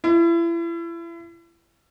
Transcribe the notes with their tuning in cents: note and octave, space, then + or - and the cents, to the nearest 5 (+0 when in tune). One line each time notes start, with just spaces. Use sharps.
E4 +35